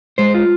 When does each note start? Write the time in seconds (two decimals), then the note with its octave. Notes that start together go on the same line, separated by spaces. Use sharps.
0.18 G#3 C5
0.35 F4